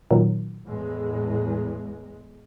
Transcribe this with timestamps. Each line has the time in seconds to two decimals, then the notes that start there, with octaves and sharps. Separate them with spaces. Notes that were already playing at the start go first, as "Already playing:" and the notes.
0.11 A#2 D#3 F#3
0.65 E2 A2 G#3